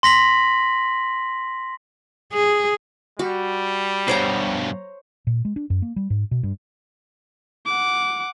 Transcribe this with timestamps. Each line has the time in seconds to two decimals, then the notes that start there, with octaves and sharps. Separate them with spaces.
0.03 C6 A#6 B6 F#7
2.33 G#4
3.19 G3 F#4
4.08 G2 B2 C5 C#5 A#5
5.27 A#2
5.45 G#3
5.56 D4
5.70 F#2
5.82 A#3
5.96 G3
6.10 G#2
6.31 B2
6.43 G2
7.66 F#5 D6